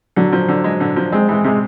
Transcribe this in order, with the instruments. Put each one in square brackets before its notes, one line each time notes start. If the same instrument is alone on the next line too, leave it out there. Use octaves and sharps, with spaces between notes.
[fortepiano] D3 [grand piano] F#3
[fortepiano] F3
D3
G#3
D3
F3
[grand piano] G#3 [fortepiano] C4
[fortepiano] E3 [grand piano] G#3
[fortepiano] C3 [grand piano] G#3